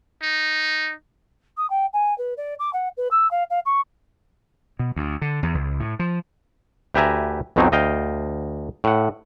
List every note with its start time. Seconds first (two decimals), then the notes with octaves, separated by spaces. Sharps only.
0.22 D#4
1.57 D#6
1.70 G5
1.93 G#5
2.18 B4
2.37 D5
2.59 D6
2.73 F#5
2.97 B4
3.11 E6
3.31 F5
3.50 F5
3.65 C#6
4.79 B2
4.96 D2
5.22 D3
5.43 E2
5.54 C#2
5.80 A2
5.99 F3
6.94 D2 G4 B4 E5 G#5 A#5
7.56 B1 F2 B2 F#3 C4 D#4
7.72 D2 D#5 F5 G5
8.84 A2 F#5